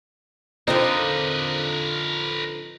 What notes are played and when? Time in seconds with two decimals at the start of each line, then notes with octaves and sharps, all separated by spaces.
0.68 D3 F3 C4 D#4 A#4 B4